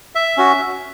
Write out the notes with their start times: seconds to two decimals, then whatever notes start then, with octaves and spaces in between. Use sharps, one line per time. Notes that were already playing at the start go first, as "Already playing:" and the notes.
0.15 E5
0.37 C#4 F#4